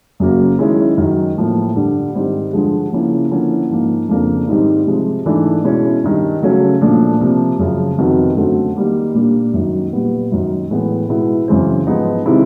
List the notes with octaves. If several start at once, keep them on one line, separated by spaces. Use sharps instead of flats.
F#2 C#3 F#3 A#3 C#4
D#3 G#3 C#4 E4
F#2 D#3 F#3
A2 F3 A#3
G2 D3 G3
G#2 D#3 G3 C4
G2 D3 F3 G#3
C#3 F3 A#3 C#4 E4
D3 F3 A#3 C#4 E4
G#2 F3 A#3
F2 C#3 F3 A#3 D4
G#2 D#3 G3 C4 D#4
C3 F3 G#3
G#2 E3 A3 D4
B2 G#3 C#4 E4
G2 D#3 G3
C#3 F#3 A3 C#4
A#2 F3 A3 D4
C3 F3 A#3
F#2 C#3 F3
F2 C3 D#3 F#3 B3
F#2 D3 F#3 A3 C4
D#3 G3 A#3
A#2 G3 A#3 D4
F#2 D#3 F#3
A#2 G3 B3
F#2 D#3 F#3
A2 E3 G#3 B3
B2 G#3 B3 E4
F#2 C#3 E3 G#3 C4
G#2 F3 G#3 B3 D#4
C3 D#3 G#3 C4 E4